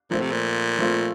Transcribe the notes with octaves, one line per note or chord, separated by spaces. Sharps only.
A#2 F3 A3 C4 F4
C3
A#2
F3 A3 C4 F4